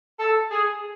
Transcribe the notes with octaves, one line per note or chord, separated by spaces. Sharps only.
A4
G#4